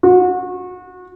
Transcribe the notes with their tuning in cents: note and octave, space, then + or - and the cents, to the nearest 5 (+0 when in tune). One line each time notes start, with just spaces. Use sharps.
F#4 -30